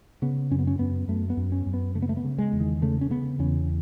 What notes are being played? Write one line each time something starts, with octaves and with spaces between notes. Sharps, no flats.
C#3 B3
F#2 C#4
B3
C#4
F#2 B3
F#2 A3
B3
F#2
C#4
F#2
B3
C#3 A3
B3
A3
B3
C#3
G#3
E2
D#3
C#3 A3
C#4
C#3 B3
E2 C#4